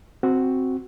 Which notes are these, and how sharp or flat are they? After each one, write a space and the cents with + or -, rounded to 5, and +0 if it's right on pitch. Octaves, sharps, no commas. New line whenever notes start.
C4 +0 F#4 +0